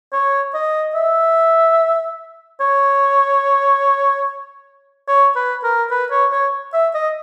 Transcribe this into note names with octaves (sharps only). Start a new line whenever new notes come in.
C#5
D#5
E5
C#5
C#5
B4
A#4
B4
C#5
C#5
E5
D#5